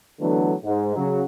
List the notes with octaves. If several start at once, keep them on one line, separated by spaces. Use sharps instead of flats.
D3 E3 F#3 A3 B3 D4
G#2
C#3 F#3